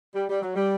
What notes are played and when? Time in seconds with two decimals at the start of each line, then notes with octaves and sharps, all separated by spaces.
0.15 G3
0.29 G3
0.42 F#3
0.56 G3